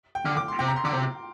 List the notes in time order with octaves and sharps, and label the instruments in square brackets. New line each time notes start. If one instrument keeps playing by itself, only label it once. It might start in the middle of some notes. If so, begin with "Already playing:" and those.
[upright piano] G5
[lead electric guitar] D3 [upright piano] F6
[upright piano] D6
C6
[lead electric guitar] C3 [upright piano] G5
[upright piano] A#5
C6
[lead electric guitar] D3 [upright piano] D6
[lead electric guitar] C3